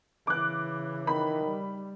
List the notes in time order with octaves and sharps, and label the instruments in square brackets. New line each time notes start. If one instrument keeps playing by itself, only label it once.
[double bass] C#3 E3 [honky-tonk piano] D6 F#6
[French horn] D#3 [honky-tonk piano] B5
[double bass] G3